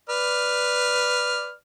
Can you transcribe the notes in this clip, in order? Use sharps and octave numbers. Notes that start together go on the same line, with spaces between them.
B4 D5 F6